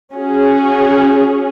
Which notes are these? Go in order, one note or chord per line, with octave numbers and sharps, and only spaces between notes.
C#4 F#4 G#4